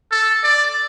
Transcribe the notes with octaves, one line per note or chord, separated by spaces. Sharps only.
A4
D5